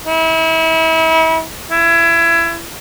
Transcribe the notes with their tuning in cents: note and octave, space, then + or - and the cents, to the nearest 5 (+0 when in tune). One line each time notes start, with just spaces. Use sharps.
E4 -35
E4 +25